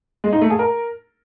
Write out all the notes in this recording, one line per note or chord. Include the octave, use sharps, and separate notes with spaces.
G#3
D#4
A3
G#4
A#4